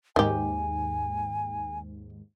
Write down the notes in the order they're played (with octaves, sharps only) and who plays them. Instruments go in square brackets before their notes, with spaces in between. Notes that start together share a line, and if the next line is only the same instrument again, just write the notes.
[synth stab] D#2 G#2 [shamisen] D#3 G4 [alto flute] G#5